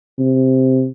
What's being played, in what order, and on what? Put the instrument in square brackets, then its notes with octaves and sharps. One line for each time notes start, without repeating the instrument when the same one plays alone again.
[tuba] C3